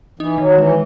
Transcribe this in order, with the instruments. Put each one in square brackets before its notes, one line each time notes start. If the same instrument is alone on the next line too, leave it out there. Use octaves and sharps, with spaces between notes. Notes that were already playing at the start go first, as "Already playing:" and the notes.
[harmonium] E3 [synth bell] D#4
[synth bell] D#3 [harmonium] F#3
[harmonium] E3 [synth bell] G#3